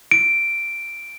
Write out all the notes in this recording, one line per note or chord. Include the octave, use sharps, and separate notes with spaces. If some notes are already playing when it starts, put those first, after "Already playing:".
D7